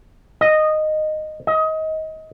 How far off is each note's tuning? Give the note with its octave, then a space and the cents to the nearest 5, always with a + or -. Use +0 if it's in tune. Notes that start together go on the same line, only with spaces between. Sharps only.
D#5 -10
D#5 +25